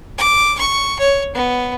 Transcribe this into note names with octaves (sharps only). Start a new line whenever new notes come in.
D6
C#6
C#5
B3